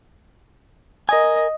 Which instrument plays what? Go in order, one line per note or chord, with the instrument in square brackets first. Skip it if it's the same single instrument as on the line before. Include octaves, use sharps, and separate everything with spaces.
[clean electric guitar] A#4 G#5 [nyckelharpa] D#5